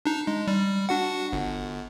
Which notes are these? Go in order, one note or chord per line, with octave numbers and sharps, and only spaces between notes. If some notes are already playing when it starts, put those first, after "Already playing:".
D4 D#4
G#3
G3
D4 F#4 F#5
G1